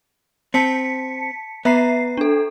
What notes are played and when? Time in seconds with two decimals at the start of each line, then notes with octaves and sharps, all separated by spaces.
0.54 C4 A5 B6 C#7
1.65 B3 E5 A#5 C7
2.17 D4 A4